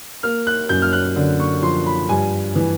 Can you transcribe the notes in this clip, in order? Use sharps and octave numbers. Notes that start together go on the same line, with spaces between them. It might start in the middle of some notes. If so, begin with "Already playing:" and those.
A#3 F6
F#6
F#2 G6
F6
F#6
D3
C#6
F3 C6
B5
G2 G#5
E3